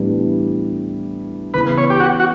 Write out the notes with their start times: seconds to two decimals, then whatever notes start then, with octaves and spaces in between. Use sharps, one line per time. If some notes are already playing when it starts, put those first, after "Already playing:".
Already playing: A2 E3 G3 B3 D4
1.54 C#3 E3 B3 B4
1.78 C#5
1.90 G4
2.00 F#4
2.20 F#4